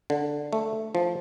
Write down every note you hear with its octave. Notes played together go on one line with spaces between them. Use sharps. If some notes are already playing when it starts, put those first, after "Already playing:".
D3
A3
F3